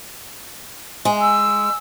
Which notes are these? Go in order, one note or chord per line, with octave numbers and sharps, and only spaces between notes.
G#3
E6